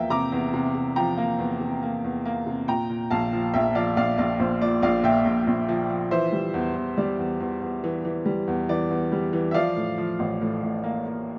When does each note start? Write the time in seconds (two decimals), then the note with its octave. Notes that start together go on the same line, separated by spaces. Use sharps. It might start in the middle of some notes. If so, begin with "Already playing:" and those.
Already playing: E2 F3 A#3 E5 G5
0.10 C3 A#5 D6
0.32 E2
0.54 C3
0.75 C3
0.96 F3 G5 A#5
1.18 A#3
1.39 E2
1.61 C3
1.83 A#3
2.04 E2
2.26 A#3
2.46 C3
2.68 A#2 G5 A#5
2.90 A#2
3.11 A#1 F5 A5
3.33 F3
3.54 A#1 E5 G5
3.75 F3 D5 F5
3.97 A#1 D5 F5
4.18 A#1 D5
4.40 A#1 C5
4.61 A#2 D5
4.82 A#1 D5 F5
5.04 A#2 E5 G5
5.25 A#1
5.47 A#1
5.69 F3
5.90 F3
6.11 E3 C5 E5
6.32 G3
6.54 E2
6.75 E2
6.97 G3 D5
7.19 E2
7.40 E2
7.62 E2
7.84 E3
8.05 E3
8.26 G3
8.48 E2
8.69 E3 D5
8.91 E2
9.12 G3
9.33 E3
9.51 E5
9.54 F3 D5 F5
9.76 A2
9.98 F3
10.19 A1
10.41 A2
10.63 A2
10.83 A#3
11.06 A#3